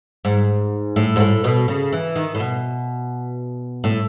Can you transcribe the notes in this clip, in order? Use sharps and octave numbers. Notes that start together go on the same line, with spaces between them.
G#2
A2
G#2
A2
B2
C#3
E3
D#3
A2
B2
A2